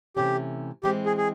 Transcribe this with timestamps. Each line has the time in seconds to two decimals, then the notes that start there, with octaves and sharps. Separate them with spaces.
0.17 C3 E3 A3 C#4 G4
0.83 E3 G#3 C4 G4
1.06 G#4
1.17 G#4